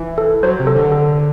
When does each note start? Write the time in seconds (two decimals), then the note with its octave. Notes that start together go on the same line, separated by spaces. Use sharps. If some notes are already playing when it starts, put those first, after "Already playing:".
Already playing: E3
0.18 A4
0.43 F#3 C5
0.59 C3
0.67 A4
0.76 D3
0.92 A4